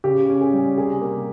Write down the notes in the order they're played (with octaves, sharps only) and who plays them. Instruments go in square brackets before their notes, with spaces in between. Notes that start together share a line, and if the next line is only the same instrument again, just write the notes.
[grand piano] C#3 [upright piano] G4
[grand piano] C#4
[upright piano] G#4
[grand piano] G3
[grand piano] C3 [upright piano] G#4
[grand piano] A#3